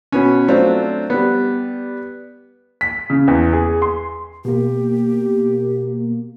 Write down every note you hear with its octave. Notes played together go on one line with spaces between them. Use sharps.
B2 B3 C#4
F#3 A3 C4 D4 F4
G3 B3
B6
C#3
E2
G#4
C6
B2 A#3 G4